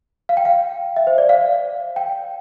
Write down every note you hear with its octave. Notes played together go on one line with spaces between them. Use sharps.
F5
G5
F5
E5
C5
D5
F5
G5